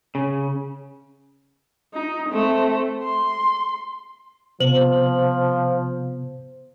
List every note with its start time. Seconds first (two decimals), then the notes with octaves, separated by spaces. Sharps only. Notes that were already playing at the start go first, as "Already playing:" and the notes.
0.15 C#3
1.94 D#4
2.29 A3 C4
3.03 C6
4.60 C3 F3 B3 C5 F#7